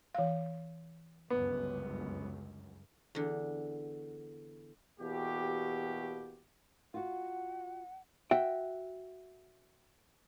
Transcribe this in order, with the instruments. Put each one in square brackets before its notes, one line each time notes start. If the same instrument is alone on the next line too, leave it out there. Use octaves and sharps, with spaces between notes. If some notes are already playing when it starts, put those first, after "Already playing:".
[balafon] E3 F5
[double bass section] G1 C#2 F#2 [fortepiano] B3
[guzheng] E2 D3
[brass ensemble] E2 B2 A#3 F#4 G4
[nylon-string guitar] F4 F#4 [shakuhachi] F#5
[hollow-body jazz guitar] F#4 E5 G5